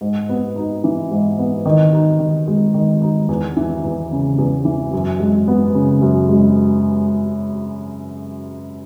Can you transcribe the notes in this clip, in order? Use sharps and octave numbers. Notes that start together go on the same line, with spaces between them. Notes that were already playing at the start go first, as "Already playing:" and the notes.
G#2
B3
D#4
E3
G#2
B3
D#3
D#4
D#3
G#3
D#3
D#4
E2
E3
E2
C#3
E2
E3
F#2
G#3
B3
C#3
F#2
G#3